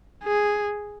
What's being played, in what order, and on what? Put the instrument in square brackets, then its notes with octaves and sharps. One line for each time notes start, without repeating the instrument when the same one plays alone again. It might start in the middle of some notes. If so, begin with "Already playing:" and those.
[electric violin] G#4